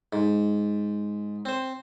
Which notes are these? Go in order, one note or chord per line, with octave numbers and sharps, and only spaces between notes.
G#2
C4 C5